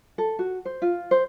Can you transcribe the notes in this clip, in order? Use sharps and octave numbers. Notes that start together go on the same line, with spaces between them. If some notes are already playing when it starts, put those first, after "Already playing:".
A4
F#4
C5
F4
C5